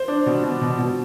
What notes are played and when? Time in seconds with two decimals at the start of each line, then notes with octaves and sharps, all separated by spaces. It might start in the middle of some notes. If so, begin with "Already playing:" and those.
Already playing: C5
0.08 D4
0.26 B2
0.43 B2
0.62 B2
0.78 B2